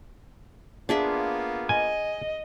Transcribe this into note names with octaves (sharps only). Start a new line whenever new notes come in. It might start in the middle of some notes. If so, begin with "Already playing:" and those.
A#3 B3 D4 F4 G#4 E5
D#5 G#5